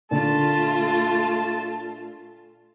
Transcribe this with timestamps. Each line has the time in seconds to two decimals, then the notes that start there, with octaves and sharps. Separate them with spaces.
0.11 A#2 D3 A3 D4 F4 A5